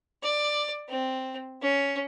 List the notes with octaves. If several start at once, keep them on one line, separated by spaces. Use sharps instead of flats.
D5
C4
C#4